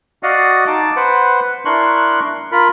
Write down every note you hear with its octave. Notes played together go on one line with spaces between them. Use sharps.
F#4 D5 D#5 F5 F#5
D#4 A5 D6
B4 C5 F#5
D4 E4 A#4 C6 C#6 F#6
F4 A#4 B5